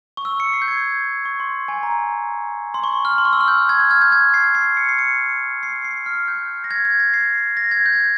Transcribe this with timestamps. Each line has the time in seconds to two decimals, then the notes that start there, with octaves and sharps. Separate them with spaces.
0.17 C#6
0.25 E6
0.40 C#7
0.53 C7
0.62 G6
0.68 G#6
1.25 C#6
1.40 C6
1.68 G#5
1.83 A#5
2.74 C6
2.84 C#6
3.05 F6
3.18 C6
3.25 C#6
3.33 E6
3.40 F6
3.48 G6
3.69 G#6
3.80 G6
3.91 F6
4.02 G6
4.12 G#6
4.34 C7
4.55 C7
4.77 C#7
4.89 C7
4.99 C#7
5.63 C7
5.85 C7
6.06 F6
6.28 G6
6.64 A#6
6.71 G#6
6.85 G#6
6.99 A#6
7.14 C7
7.57 A#6
7.71 G#6
7.86 G6